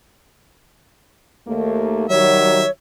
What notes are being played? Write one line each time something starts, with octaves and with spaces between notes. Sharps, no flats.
D#2 A3 A#3
D#3 F#3 G3 C#5 E5